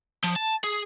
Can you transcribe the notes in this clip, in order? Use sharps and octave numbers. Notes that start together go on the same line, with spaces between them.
F3
A5
G#4